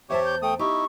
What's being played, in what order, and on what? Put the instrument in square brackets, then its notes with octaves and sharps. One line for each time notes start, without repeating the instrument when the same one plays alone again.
[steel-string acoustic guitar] E2 C5 A5 [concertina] G4 C#5 [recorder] E5
[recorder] G6
[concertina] A3 D#6 [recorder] G5
[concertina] D#4 E4 [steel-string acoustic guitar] G4 [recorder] C#6